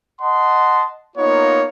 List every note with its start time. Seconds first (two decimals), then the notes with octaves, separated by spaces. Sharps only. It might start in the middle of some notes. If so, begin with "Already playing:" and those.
0.21 D#5 F#5 A5 C6
1.17 A#3 B3 D#4 F4 C#5